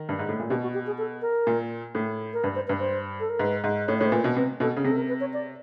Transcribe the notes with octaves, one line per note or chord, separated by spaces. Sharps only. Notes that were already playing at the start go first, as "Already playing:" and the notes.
Already playing: D#3
G2
G#2
A2
A#2
B2 G4
F#4
G4
G#4
A4
A#4
A#2
A2
A#4
G2 B4
C5
G2 B4
C5
A4
A#4
G#2 B4
G#2
A2 C#5
A2 C#5
C5
A#2 B4
B2
C3 B4
B2 A4
C#3
C3 G#4
A4
A#4
B4
C#5
D5